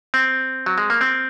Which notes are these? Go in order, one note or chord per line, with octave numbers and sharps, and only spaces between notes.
C4
F#3
G#3
A#3
C4